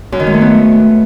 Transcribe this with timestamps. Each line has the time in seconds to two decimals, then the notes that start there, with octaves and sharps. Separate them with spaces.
0.12 F#2
0.20 D#3
0.27 G#3
0.34 A3
0.41 B3